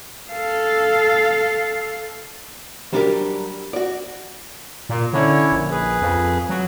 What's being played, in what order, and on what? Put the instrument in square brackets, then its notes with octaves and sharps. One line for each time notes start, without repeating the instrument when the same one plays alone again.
[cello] A4 F5
[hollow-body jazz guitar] F#3 G3 D4 F#4 G4 A#4
F#4 D5
[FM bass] A#2
[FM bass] D3 [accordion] C#4 E4 C#5
[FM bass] A#1
[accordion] G#4 B4
[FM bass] F2
F#3